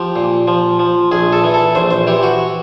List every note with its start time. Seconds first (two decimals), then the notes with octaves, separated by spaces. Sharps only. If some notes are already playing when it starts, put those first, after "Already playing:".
Already playing: F3 G4
0.16 A#2
0.48 F3
0.79 F3
1.12 A#1 G#4
1.33 A4
1.44 E3
1.54 A4
1.75 A#1 C5
1.91 C5
2.07 E3 G4
2.23 F#4